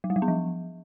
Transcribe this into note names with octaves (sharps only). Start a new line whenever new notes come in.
F#3
G3
F#3
B3
F3